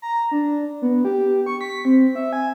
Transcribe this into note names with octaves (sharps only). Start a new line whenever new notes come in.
A#5
D4
B3
G4
C#6
B6
C4
E5
G#5